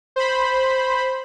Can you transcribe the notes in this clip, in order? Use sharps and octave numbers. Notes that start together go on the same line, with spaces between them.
C5 B5